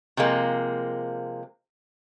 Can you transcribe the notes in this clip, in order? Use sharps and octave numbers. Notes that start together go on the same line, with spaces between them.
C3 F3 G#3 A#3